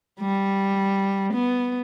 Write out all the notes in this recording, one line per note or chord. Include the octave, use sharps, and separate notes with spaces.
G3
B3